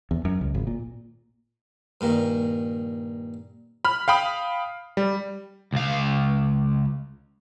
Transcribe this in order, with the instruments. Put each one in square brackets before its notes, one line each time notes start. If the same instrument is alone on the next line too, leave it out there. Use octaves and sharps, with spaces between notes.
[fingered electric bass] E2
F#2
C#2
G#1
A#2
[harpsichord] G2 A#2 D#3
[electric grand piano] B5 F6
F5 G5 B5 D#6
G3
[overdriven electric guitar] C#2 F5